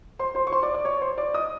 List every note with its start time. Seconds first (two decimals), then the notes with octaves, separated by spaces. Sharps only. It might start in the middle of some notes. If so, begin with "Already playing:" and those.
0.19 C5 C6
0.35 C5 C6
0.47 C#6
0.52 C5 C6
0.63 D5 D6
0.75 D5 D6
0.85 C#5 C#6
1.01 C5 C6
1.18 D5 D6
1.34 D#5 D#6